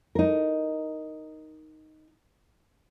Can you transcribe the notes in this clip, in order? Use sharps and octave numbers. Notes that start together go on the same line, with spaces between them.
D#4 A#4